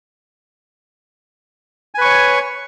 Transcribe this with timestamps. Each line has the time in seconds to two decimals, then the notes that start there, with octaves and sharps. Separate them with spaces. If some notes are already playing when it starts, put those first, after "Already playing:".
1.95 G#5
1.98 B4
2.01 C#6
2.05 C#5